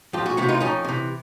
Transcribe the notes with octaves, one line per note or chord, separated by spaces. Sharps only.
F2 F4 G4
F#4 G#4
C3 E3 E4 F#4
D#4 F4
F2 C#4 D#4
C3 E3